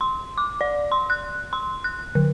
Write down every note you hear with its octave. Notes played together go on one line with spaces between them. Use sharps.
C6
D6
D5
C6
F#6
C6
F#6
D3